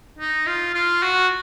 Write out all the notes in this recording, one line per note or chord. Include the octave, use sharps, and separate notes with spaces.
D#4
F4
F4
F#4